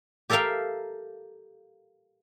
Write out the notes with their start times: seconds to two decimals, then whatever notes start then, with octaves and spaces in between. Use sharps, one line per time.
0.30 G4 A4 A#4 E5 F5 G5